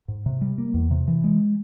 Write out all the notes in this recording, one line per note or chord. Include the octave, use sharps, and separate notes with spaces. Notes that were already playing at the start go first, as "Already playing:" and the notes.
G#2
C3
G3
A#3
E2
C3
E3
G#3